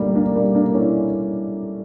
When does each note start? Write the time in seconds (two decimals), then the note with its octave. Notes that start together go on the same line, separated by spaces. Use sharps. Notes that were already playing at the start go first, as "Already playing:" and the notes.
Already playing: G1 G2 D3 G3 A3 A#3
0.15 A#3 D4
0.35 G3 A#3
0.55 A#3 D4
0.74 C#4 E4